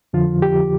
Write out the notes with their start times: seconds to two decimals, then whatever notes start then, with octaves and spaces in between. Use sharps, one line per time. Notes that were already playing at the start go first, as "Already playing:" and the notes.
0.13 F2 D3 F3 F4
0.42 G4